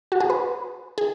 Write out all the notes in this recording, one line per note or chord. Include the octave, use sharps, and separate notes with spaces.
F#4
G#4
B4
G#4